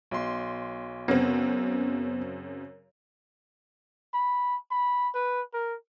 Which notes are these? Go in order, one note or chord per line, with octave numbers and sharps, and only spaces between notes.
B1 C6
F#2 C#3 B3 C4
B5
B5
B4
A#4